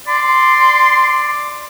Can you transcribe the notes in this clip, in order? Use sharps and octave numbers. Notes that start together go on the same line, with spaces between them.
D5 C6